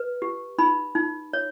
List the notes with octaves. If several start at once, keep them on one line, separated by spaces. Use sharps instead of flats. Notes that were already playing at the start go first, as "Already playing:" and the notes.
Already playing: B4
G4
D#4 B5
D#4
C#5